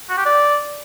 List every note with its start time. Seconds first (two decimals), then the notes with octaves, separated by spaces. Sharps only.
0.09 F#4
0.17 G4
0.26 D5